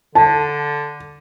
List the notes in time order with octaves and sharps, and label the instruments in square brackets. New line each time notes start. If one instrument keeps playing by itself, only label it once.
[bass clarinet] D3 [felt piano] A5